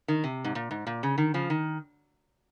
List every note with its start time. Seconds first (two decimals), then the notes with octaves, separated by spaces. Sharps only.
0.08 D#3
0.24 C3
0.45 G#2
0.55 A#2
0.71 G#2
0.87 A#2
1.03 C#3
1.18 D#3
1.34 C#3 F3
1.50 D#3